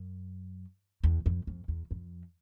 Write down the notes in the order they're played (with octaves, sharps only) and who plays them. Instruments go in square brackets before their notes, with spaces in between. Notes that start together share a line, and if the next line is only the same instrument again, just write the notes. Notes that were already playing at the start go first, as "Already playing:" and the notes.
Already playing: [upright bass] F#2
E2
F2
F2
E2
F2